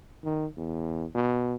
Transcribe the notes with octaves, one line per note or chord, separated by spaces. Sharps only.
D#3
E2
B2